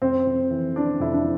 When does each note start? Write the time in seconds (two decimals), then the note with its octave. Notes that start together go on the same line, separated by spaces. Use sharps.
0.02 F2 C4
0.27 F2
0.50 E3
0.75 E3 D4
1.00 F2 E4
1.13 D4